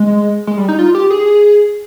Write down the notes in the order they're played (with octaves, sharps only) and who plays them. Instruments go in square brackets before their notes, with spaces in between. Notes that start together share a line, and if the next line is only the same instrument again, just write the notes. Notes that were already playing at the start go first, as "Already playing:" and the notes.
Already playing: [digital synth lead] G#3
G#3
G3
D#4
F4
G4
G#4